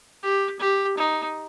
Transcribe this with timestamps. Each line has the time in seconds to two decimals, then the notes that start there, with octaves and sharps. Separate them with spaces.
0.23 G4
0.59 G4
0.97 D#4